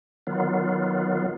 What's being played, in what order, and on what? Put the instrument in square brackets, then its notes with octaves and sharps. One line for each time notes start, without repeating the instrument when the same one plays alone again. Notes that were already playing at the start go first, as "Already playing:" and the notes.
[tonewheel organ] D#3 F#3 B3 F4